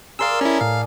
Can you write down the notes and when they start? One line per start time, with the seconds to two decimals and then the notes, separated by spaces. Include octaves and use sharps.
0.19 G#4 A#4 D5 F5 C6 E6
0.41 C#4 E4 G#4 A4
0.61 A2 F5